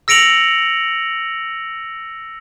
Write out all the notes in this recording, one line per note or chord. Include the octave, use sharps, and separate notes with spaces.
E6 A#6 C#7 D7 F7 F#7